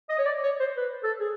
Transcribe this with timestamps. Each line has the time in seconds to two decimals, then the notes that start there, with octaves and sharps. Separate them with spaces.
0.09 D#5
0.18 C#5
0.26 D5
0.43 C#5
0.60 C5
0.77 B4
1.04 A4
1.20 G#4